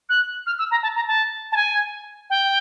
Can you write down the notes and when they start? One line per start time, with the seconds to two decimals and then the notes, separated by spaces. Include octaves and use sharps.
0.09 F#6
0.46 F6
0.59 E6
0.71 A#5
0.83 A5
0.96 A#5
1.07 A5
1.52 A5
1.56 G#5
2.30 G5